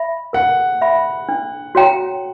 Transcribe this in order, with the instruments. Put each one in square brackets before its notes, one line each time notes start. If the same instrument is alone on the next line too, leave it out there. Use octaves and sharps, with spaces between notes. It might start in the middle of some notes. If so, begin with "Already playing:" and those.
Already playing: [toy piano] E5 B5
[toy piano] A#4 [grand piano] F#5
[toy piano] E5 B5
D4
F#4 C#5 G5 A#5